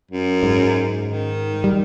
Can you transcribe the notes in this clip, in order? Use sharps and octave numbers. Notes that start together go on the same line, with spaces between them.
F#2
G#2
D#3
G3